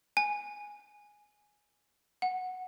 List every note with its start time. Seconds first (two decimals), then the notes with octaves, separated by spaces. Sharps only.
0.17 G#5
2.22 F#5